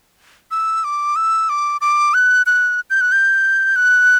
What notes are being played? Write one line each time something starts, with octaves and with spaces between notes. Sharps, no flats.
E6
D6
E6
D6
D6
F#6
F#6
G6
F#6
G6
F#6